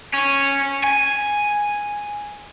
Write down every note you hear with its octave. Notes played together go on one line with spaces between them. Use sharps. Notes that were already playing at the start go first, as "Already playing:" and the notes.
C#4
G#5